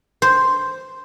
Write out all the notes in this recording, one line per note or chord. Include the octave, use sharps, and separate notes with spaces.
C5